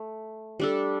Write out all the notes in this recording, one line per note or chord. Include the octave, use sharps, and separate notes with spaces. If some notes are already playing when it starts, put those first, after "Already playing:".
Already playing: A3
G3 D4 A4